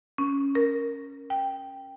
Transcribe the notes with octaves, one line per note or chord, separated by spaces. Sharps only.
C#4
A#4
G5